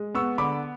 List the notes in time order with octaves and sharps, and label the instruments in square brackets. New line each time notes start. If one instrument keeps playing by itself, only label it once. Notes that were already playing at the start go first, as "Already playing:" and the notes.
Already playing: [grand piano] G#3
B3 C#6 E6
D3 B5 D6